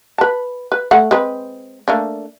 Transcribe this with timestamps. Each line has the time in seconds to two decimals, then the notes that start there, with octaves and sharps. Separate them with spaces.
0.18 B4 A5
0.72 B4
0.91 A3 F#5
1.11 G#3 C4 B4
1.88 A3 A#3 D4